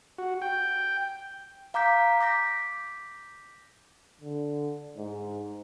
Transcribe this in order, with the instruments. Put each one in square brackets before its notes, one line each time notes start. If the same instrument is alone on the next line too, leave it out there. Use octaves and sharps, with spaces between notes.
[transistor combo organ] F#4
G5
[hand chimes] F5 A#5 D6 G6 B6
D6 G6 A#6 B6
[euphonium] D3
G#2